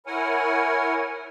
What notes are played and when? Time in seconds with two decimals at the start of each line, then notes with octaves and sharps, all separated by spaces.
0.06 E4 A#4 C#5 F#5 G#5